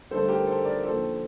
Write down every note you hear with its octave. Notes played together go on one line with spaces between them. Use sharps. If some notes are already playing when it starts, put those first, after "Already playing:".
G2 D3 A3 A4 C5
G4 A#4
A4 C5
A#4 D5
D#2 D3 F3 A4 C5